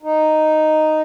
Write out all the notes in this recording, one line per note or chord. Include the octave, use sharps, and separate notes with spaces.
D#4